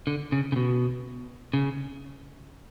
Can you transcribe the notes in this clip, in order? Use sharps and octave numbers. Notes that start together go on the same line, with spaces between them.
D3
C#3
C#3
B2
C#3